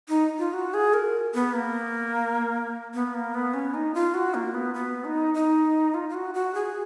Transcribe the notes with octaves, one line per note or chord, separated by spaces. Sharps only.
D#4
F4
F#4
G#4
A#4
B3
A#3
B3
A#3
B3
C#4
D#4
F4
F#4
A#3
B3
B3
D#4
D#4
F4
F4
F#4
F#4
G#4